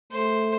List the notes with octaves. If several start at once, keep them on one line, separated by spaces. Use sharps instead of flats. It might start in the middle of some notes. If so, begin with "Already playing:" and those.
A3 C5